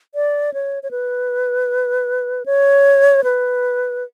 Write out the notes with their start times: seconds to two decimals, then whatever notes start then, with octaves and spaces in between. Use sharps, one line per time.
0.15 D5
0.54 C#5
0.83 C#5
0.91 B4
2.46 C#5
3.24 B4